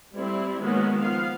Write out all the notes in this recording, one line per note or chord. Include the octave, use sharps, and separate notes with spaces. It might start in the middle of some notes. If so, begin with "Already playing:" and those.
G3 A3 C4 E4
D#3 F#3 G#3 A#3 B3 C#4
F3 B3 F5